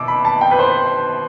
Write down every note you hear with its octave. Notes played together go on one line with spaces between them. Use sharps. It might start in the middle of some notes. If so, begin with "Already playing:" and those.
Already playing: B2 D6 E6
B5
A5
G5
B4
C5